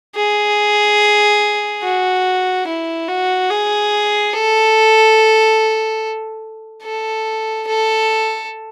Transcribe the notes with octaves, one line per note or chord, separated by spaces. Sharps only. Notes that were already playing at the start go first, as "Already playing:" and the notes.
G#4
F#4
E4
F#4
G#4
A4
A4
A4